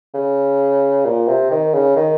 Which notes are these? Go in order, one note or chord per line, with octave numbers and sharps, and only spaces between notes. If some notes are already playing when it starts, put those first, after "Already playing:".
C#3
A#2
C3
D#3
C#3
D#3